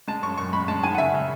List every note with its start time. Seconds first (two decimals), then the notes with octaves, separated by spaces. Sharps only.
0.08 G#3 A5
0.23 F#2 C#6
0.37 F#2 C#6
0.53 G#3 B5
0.68 G#3 A5
0.83 D#3 G#5
0.94 F#5
0.98 C#3 E5
1.14 C#3